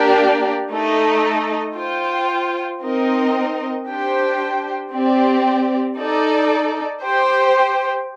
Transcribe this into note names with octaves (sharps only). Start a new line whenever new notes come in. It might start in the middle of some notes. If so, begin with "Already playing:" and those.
Already playing: A#3 D4 G4 A#4 D5
A3 D#4 A4 D#5
F4 C5 G5
C4 D#4 A#4 D#5
D4 G4 C5 G5
C4 G4 D5
D#4 A4 D5
G4 C5 G5